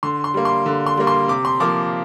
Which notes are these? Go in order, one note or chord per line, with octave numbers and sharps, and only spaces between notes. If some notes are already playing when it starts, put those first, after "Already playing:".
D3 C6
C6
G3 A#3
C6
D3
C6
G3 A#3
C6
C3 D6
C6
F3 A#3 D6